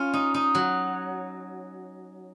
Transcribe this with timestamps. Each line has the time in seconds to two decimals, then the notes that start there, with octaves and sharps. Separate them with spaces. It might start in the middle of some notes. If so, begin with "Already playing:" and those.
Already playing: C#4 F4
0.13 D#4
0.34 D#4
0.55 F#3